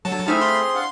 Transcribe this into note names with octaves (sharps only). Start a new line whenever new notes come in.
D3 F#3 A5
A3 C4 D#4 E4 G#4 E5 B5 F6
F4 C6
D4 F5 F#5